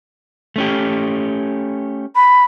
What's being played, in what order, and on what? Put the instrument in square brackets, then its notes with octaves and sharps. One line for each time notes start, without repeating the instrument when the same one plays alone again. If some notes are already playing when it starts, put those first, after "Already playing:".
[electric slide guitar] A3 C#4 G4
[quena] B5